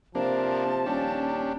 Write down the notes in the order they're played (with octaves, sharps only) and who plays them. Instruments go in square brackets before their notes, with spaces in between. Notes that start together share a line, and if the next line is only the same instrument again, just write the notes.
[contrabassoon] C3 [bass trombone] F3 [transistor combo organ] A#3 D4 [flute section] A5
[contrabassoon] D#1 [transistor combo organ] C#4 D4 G4